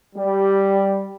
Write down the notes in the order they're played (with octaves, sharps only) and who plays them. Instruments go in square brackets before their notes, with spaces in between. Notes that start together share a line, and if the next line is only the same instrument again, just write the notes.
[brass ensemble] G3